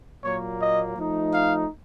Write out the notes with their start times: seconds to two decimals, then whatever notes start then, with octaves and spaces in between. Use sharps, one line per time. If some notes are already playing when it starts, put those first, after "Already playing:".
0.24 A#2 F#3 A#3 C#5
0.60 D#5
0.97 F3 A3 D#4
1.32 F5